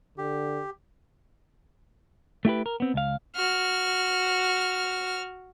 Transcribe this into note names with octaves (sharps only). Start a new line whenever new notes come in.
D3 G4
A3 E4 G4 B4
A#4
B3 C4
C#2 F5
F#4 F6